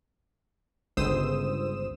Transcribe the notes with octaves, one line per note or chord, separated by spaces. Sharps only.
G1 C#2 C5 D#6 E6 E7